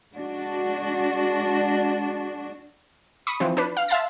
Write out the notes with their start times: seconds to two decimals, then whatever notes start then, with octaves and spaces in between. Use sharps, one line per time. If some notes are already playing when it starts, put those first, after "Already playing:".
0.14 G#3 D4 F#4
3.27 B5 C#6 D#6
3.40 E3 F3 C4
3.57 D4 B4
3.77 F5
3.88 E5 F5 A5 C6 A6